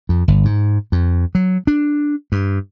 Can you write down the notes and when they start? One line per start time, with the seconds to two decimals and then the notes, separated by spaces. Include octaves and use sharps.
0.09 F2
0.28 G1
0.45 G#2
0.92 F2
1.35 F#3
1.67 D4
2.32 G2